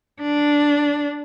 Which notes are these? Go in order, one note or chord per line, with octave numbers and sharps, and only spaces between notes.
D4